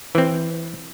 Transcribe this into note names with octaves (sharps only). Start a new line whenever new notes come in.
E3 C4